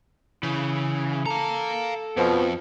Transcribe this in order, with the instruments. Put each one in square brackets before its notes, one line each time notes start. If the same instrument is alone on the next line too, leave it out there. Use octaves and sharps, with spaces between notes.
[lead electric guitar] C#3 [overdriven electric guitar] E3
[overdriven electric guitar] A4 [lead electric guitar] F5 A#5
[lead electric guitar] F2 [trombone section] B2 F3